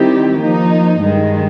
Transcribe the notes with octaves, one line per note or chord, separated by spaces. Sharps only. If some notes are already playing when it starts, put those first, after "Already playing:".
Already playing: D#3 G3 C4 E4 G4
F3 A#3 D#4
G2 D#3 G#3